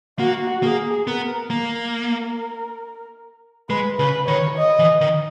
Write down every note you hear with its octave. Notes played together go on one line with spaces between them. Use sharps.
A#3 F#4
A#3 G#4
B3 A#4
A#3 A#4
G#3 B4
C#3 B4
D#3 C#5
D#5
E3
D#3